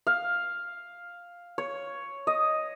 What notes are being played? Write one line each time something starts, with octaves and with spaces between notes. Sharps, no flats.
F5
C#5
D#5